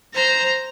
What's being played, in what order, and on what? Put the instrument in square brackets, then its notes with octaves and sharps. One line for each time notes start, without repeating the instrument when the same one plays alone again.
[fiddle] C5 [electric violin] A#5